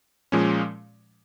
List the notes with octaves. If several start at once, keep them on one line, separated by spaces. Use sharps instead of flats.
A#2 F3 G#3 C#4